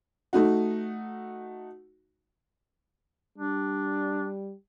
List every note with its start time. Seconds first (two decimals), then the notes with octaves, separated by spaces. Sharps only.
0.33 A3 D#4 F#4
3.38 G3 D4